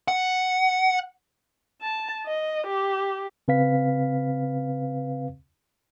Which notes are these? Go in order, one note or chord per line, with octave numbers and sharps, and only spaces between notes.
F#5
A5
D#5
G4
C#3 C4 B4 F5 B6